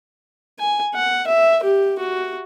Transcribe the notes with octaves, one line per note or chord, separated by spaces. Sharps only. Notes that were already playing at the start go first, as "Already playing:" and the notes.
G#5
F#5
E5
G4
F#4